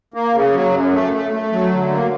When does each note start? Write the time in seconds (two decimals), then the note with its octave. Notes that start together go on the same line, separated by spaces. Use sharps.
0.14 A#3
0.34 C#3
0.53 F#3
0.73 F#2
0.93 A3
1.13 A3
1.31 A3
1.52 F#3
1.72 D3
1.91 A#3